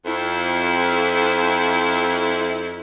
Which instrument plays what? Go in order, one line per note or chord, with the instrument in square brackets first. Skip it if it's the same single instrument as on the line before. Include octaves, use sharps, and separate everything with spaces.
[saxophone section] F2 E4